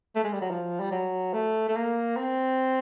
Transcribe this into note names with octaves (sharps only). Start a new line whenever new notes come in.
A3
G#3
G3
F#3
F3
G3
F#3
A3
A3
A#3
C4